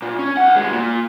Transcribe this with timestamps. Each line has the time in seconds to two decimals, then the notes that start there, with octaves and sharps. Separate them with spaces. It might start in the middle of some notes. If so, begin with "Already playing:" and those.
0.02 A#2
0.19 C#4
0.37 B1 F#5
0.55 D#2 G#3
0.72 A#2